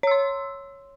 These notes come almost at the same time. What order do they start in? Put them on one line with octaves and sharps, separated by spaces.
C#5 E6 C6